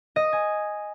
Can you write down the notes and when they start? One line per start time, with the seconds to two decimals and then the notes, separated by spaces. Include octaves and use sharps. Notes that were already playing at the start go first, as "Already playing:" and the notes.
0.16 D#5
0.33 G#5